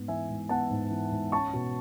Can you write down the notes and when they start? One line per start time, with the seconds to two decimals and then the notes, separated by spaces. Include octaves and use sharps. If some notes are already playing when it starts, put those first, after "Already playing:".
Already playing: G#2 B3
0.08 E3 E5 G#5
0.29 G#2
0.49 B3 F#5 A5
0.70 G#2
0.91 E3
1.11 G#2
1.32 C#4 A5 C#6
1.53 B2